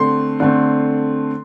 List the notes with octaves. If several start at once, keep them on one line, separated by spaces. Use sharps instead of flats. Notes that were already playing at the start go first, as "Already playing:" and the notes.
Already playing: D3 A3 C4 C6
D3 A3 C4